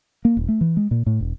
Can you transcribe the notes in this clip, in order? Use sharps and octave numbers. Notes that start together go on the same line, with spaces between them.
A#3
D#1
A3
E3
G#3
A#2
A2
E1